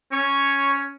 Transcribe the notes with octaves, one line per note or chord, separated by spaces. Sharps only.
C#4 C#5 C#6